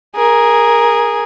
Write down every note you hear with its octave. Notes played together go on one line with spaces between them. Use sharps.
G#4 A#4